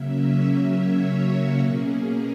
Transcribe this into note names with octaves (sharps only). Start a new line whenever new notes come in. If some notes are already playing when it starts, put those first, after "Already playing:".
Already playing: C#3 F#3 A#3 C#4 E5
C#5
F#4
B2 A#3 C#4 G#4
G#4